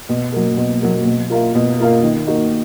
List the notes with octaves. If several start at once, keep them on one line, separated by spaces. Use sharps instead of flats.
B2
F#3 A#3
B2
F#3 A#3
B2
A#3 F4 A#4 F5
B2
A#3 F4 A#4 F5
D#3
A#3 D#4 F#4